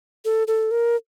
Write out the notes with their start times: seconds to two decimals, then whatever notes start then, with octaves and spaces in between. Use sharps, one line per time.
0.25 A4
0.47 A4
0.71 A#4